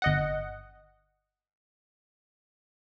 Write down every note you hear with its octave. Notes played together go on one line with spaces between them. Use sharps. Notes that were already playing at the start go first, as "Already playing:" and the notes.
G1 D#5 F#5